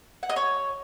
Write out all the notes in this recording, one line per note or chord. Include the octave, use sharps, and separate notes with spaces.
F#5
D#5
C#5